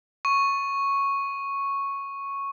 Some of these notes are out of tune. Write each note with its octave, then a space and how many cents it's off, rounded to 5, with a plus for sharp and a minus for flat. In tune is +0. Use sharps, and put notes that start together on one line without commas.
C#6 -5